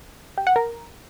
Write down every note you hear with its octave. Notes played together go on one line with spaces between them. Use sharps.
G4
F#5
A#4